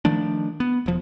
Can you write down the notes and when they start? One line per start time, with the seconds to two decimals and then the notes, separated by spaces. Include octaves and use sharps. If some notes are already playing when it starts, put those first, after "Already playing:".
0.05 D#3 F3 A3 D4
0.60 B3
0.86 E1 F3